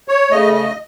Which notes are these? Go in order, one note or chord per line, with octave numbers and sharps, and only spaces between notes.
C#5
C#3 A3 D#5
D#5